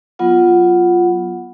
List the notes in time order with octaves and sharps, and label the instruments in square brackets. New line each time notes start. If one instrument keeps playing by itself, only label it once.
[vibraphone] F#3 B3 F4 F#5